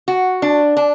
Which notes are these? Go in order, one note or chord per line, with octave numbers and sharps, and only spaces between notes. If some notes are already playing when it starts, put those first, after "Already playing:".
F#4
D4
D4